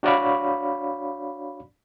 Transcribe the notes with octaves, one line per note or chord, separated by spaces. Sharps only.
D4 F#4 C#5 D5 F5 B5